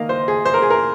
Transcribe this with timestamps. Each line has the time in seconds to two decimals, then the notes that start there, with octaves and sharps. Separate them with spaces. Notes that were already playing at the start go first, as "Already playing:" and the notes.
Already playing: D#3 A#3 D#5 F5
0.09 C5
0.28 G#4
0.45 C5
0.54 A#4
0.62 G#4
0.70 A#4